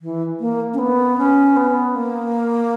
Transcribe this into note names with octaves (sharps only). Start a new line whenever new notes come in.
E3
A#3
C#4
B3
C#4
B3
A#3